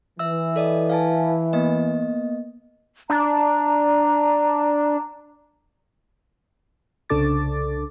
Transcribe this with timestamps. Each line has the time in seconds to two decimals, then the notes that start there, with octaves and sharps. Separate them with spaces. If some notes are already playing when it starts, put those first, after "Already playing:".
0.19 E3 E5 E6
0.56 A4 D5 D#5
0.90 F5 G#5 A5
1.53 A#3 B3 D#5
3.10 D4 A#5
7.10 C2 C#3 D4 A4 D6 A6